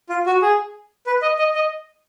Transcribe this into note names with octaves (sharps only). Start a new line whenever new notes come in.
F4
F#4
G#4
B4
D#5
D#5
D#5